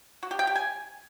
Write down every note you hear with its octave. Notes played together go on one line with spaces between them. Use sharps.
F#4
G4
G5
G4
G#5